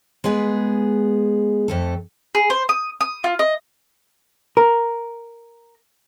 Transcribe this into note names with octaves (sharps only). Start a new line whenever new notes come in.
G#3 B3 G#4 B4
F2 A3 A4
G#4
C5
D#6
D#6
F4
D#5
A#4